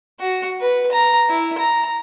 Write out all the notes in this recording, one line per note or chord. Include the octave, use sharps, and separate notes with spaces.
F#4
B4
A#5
E4
A#5